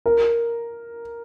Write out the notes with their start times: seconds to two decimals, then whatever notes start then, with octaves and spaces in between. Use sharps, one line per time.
0.06 A#4